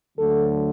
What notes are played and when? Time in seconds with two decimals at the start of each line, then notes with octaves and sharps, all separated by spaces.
0.18 D2 D3 F#3 A3 A4